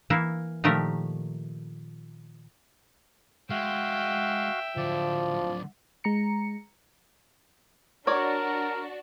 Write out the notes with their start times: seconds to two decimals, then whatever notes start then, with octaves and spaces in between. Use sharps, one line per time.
0.10 E3 A#3 E4
0.64 A#2 D#3 F3 A3 G4 A#4
3.50 G#3 F#4 E5 F5 G5
4.77 D3 F3 F#3 D5
6.04 G#3 A#5 C#7
8.07 D4 F#4 A#4 C#5 D5